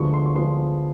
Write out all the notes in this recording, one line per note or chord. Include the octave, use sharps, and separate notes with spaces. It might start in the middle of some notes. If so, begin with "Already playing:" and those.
Already playing: D2 D3 F3 G#3 B3 C#6
C6
C#6
D3 F3 G#3 B3 C6